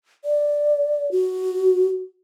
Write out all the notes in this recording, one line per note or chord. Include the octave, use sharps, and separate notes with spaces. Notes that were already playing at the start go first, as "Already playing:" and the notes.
D5
F#4